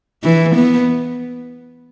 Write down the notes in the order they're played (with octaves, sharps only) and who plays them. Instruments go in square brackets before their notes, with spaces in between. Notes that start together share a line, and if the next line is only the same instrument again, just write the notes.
[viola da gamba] E3
B3